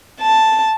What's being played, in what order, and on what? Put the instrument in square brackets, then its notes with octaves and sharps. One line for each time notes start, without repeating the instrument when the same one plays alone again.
[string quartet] A5